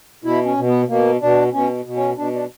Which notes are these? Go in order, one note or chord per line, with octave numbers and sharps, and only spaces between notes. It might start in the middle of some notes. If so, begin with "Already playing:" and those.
B2 E4
C#4
B2
B3
B2 A#3
B2 D4
B2 C#4
B2
C#4
B2 D4
D4